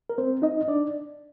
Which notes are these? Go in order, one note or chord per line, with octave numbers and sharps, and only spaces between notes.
A#4
C4 C5
D#4 D#5
D4 D5